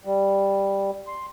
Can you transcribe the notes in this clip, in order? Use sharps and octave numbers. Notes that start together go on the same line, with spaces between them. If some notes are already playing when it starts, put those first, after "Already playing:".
G3
C6